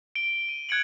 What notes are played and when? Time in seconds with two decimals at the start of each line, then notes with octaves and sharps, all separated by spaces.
0.15 D7 G7
0.49 D#7
0.69 F#6 G#6 C#7 D7 F#7